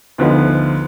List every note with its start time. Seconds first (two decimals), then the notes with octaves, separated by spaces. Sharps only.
0.18 D2 D3 F3 B3 D#4